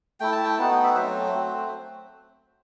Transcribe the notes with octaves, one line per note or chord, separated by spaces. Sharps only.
A3 E4 G5
A5
G5
B3 D#4 F#4 A5
G5
E5
F#3 A3 C4 C5
A3 C4 F#4